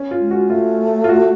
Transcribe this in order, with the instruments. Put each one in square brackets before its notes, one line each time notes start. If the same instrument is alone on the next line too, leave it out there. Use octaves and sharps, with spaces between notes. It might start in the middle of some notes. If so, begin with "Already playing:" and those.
Already playing: [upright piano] C#4
F4
[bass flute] G#3
[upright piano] F#4
[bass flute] A3 [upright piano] F4
[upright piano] F4
F#4